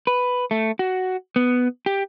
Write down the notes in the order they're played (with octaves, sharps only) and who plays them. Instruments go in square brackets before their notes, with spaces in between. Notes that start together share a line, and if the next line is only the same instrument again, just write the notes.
[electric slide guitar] B4
A3
F#4
B3
G4